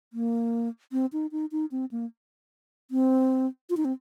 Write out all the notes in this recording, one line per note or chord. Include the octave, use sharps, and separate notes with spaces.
A#3
C4
D#4
D#4
D#4
C4
A#3
C4
F4
D#4
C4